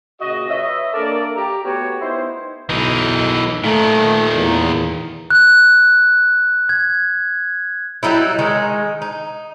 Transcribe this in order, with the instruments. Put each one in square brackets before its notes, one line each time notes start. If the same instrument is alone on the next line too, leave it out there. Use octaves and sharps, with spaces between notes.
[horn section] A#2 C#3 F#4 D#5
B4 C#5 D#5 E5
A#3 D4 A4 A#4 D5
G4 A#5
A3 B3 F#4 G4 C#5
B3 D#4 E4 C5
[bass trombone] B1 [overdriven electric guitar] E3 D#4
[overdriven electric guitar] A#2 D#3 [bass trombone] A3
[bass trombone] E2
[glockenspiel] F#6
G#6
[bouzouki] F#3 G3 D#4 E4
D#3 G#3 D#4
D#4